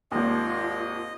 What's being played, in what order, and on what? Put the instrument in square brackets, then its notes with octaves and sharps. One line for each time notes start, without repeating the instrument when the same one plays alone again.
[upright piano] G#1 D#2 [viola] F4 [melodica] D#5